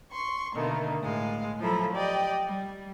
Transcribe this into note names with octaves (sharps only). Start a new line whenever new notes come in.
C6 C#6
B2 D3 D#3 A3 A#3
A2 G#3 F5
F3 F#3 E4 A4 A#5 B5
G4 D5 D#5 G5
G3